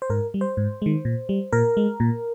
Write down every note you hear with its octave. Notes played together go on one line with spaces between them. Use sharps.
C5
G#2 A#4
G3
C5
G#2
D#3 G#3
A#2
G3
A#2 A#4
G#3
A#2